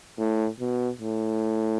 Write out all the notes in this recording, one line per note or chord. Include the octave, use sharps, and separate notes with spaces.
A2
B2
A2